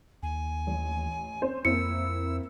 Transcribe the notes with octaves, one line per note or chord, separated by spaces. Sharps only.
D#2 G#5
A1
C4 C#4 C5
F2 A#3 C4 E4 E6 C#7